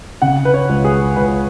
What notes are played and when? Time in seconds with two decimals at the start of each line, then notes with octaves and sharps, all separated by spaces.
0.22 C#3 F#5
0.45 B4
0.54 C#5
0.69 C#2
0.85 G#4
1.16 C#2 B4